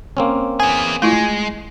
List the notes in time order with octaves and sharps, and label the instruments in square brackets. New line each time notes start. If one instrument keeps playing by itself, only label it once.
[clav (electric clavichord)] A#3 C4 C#4
[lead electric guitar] B3 G#4 [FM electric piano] G#5
[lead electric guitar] G#3 [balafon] A3 E4 F4